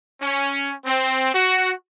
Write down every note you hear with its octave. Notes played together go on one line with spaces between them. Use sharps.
C#4
C4
F#4